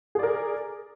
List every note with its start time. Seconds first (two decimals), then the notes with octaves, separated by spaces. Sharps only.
0.15 G#4
0.19 D5
0.23 A#4